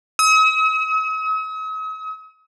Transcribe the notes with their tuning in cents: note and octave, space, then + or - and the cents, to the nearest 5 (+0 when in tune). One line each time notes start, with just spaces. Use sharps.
D#6 +45